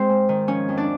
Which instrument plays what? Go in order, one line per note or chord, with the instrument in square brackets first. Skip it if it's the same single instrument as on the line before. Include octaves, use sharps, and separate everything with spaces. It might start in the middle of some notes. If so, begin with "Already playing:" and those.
Already playing: [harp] G#3 C4 C5
G#2
D#3
F3 C#4 C#5
F2
D4 D5